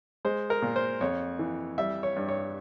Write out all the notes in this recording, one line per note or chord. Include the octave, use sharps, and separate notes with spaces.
G#3 C5
A#4
A#2
C5
F2 C#5
E3
G3 E5
C#5
G2
C#5